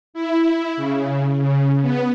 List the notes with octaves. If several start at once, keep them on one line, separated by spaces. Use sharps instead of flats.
E4
C#3
C#3
B3